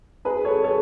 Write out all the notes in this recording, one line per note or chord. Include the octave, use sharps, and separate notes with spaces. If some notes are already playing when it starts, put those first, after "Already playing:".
G#4 B4
A4 C#5
A4 C#5